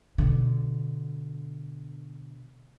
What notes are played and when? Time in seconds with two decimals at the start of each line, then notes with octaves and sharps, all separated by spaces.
0.18 B2 D3